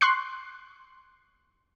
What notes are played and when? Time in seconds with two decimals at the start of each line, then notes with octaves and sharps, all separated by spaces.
0.01 C6 C#6 F#6 C7